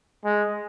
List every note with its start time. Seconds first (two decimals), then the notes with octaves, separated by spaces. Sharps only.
0.25 G#3